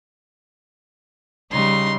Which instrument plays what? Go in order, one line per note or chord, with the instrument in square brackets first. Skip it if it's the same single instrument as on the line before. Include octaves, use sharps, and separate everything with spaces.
[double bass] C#3 G3 [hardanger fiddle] D#4 C6